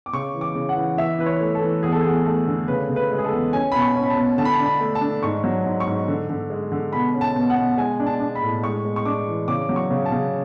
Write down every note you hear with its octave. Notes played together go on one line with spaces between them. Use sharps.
D6
C#3 C#6
E3
D6
C#3
F#5
E3
E3 E5
E3 B4
C#5
A3
A4
E3
E2 G#4
A4
G#4
E2
A3 A4
D3
C#3 B4
C#3
B4
G#3
G#4
A4
E2
C#4 G#5
B2 B5
C#6
C#4
B5
A5
B2
D3 A5
B5
A5
D4
B5
A3
A5
D4
G#2 C#6
F#3
G#2
C#6
G#2
D3
D3
G#3
D3
B2 B5
C#4
A5
B2
F#5
B2
G#3 G#5
D4
A5
D4
B5
A2
G#3 C#6
G#3
C#6
D4 D6
E3
C#3 D6
F#3
C#6
C#3
A5
C#3